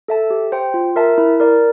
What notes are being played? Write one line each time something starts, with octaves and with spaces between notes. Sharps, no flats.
A4 E5 A5
G4
C5 G5
F4
A#4 E5 A5
E4
A#4 D5